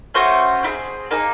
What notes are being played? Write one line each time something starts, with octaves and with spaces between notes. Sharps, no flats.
A3 C#4 F#4 C5
C4 E4 G#4
A#3 D#4 G#4